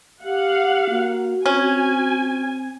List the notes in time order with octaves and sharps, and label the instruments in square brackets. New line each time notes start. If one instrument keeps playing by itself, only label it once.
[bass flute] G4 [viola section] F5 F#5
[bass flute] A#3 [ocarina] F#4
[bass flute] C4 [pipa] C#4 [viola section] G#5